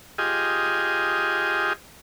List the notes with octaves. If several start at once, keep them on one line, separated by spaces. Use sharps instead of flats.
F4 G4 G#4 D#5